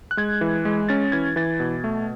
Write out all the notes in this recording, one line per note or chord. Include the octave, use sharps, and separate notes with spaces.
F#6
G#3 G#6
E3
G#3
C#4 A6
E3 G#6
E3 A6
B2
A3